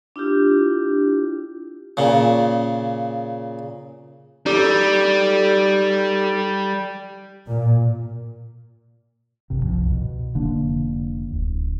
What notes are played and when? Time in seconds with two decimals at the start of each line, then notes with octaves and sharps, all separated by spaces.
0.16 D4 E4 F4 G4
1.97 A#2 C#3
4.46 G3 D#4 G4 A4
7.48 A#2
9.50 G1 F#2 C3
9.63 C2 F3
9.91 B2
10.35 F1 D3 A#3 D4
11.29 D1